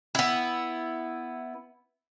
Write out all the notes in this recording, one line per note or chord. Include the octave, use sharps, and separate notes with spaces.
B3 E4